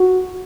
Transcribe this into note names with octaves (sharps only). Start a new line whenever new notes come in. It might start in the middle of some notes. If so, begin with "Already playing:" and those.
Already playing: F#4